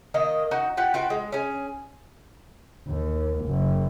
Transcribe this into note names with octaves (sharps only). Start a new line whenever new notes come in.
D#3 A#3 D#5
D#4 F#4
F4 G4 F#5
F4 F#4 B4 G5
G#3
C#4 G#4
D#2
F#1